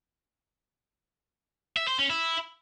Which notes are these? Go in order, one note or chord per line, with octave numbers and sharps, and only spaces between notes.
E5
C5
C#4
E4